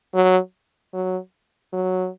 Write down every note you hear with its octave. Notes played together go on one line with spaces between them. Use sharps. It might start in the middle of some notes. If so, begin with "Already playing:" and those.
F#3
F#3
F#3